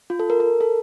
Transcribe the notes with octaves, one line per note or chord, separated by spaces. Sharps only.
F4
A4
A#4
A#4
A4